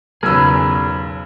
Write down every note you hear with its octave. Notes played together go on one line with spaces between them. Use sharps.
B1 E2 C#3 G#4 A#4 B4 E6